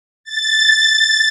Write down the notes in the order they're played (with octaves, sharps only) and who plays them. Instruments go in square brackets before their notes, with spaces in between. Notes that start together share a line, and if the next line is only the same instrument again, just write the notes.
[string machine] A6